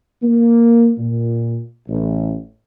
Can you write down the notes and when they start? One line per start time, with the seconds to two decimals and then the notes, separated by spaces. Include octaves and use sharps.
0.23 A#3
0.99 A#2
1.88 A1